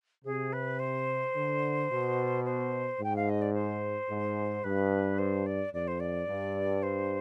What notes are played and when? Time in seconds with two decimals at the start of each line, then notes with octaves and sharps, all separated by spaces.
0.25 C3 G#4
0.53 B4
0.79 C5
1.35 D3
1.90 B2
2.45 C5
2.99 G#2 G5
3.16 F5
3.29 D#5
3.41 D5
3.53 C5
4.09 G#2
4.64 G2 B4
5.18 C5
5.46 D5
5.73 F2 D5
5.88 C5
6.00 D5
6.28 G2
6.83 C5